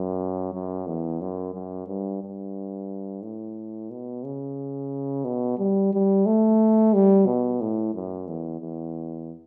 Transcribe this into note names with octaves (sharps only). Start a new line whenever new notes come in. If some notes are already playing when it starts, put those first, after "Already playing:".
Already playing: F#2
F#2
E2
F#2
F#2
G2
G2
A2
B2
C#3
B2
G3
G3
A3
G3
B2
A2
F#2
E2
E2